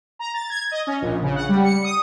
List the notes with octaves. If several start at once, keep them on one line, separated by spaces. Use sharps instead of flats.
A#5
A6
G#6
D#5
C#4
A#1
C#3
F#5
G3
C#7
D#6